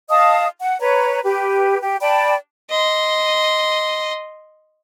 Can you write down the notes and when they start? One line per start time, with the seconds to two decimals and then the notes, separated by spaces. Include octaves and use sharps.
0.09 D#5 F5 A5 D#6
0.61 F#5
0.80 B4 C#5 A#5
1.23 G4 B4
1.81 G4
2.01 D5 G5 A5 B5
2.70 D#5 C6